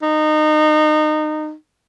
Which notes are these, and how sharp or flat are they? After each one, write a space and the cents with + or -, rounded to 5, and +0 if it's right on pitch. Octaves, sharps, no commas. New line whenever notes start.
D#4 -25